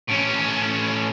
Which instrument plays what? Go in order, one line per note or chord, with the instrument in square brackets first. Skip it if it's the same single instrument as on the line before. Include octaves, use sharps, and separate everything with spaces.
[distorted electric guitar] A2 C#4